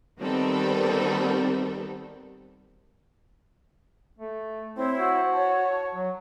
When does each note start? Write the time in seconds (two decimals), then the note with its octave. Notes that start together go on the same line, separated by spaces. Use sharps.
0.20 D#3 G3 B3 C4 A4 A#4
4.19 A3
4.77 C4 E4 C5 C#5
4.98 F#4
5.34 C#5 A5
5.95 F#3